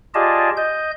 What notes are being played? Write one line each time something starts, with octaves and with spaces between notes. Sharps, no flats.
F4 G4 G#4 D5 D#5 A5
D#5 G6